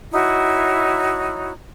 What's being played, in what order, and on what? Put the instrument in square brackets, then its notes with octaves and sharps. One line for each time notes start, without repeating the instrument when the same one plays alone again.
[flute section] D#4 E4 F#4 C#5